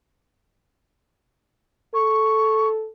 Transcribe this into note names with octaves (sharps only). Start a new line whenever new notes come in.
A4 C#6